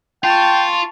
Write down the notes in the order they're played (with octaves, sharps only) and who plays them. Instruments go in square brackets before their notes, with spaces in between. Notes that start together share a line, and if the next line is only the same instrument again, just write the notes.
[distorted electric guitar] F4 [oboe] G5 [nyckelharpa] A5 C#6